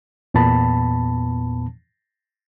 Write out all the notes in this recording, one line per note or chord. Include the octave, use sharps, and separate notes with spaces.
E2 A#2 B3 A5 B5